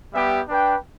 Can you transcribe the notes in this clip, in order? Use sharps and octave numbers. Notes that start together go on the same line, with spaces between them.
G3 B3 G4 E5 G5
D4 B4 G5